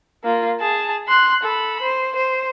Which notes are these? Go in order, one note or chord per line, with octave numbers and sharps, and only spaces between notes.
A#3 F4
G#4 A5
C6 F#6
A4 B5
C5
C5